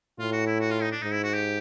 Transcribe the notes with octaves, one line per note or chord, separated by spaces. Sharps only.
A2 F4
F#4
E4
F#4
F4
D#4
D4
G#2 D#4
E4
F#4
G4